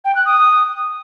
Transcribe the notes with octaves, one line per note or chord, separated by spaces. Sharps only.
G5
F#6
D#6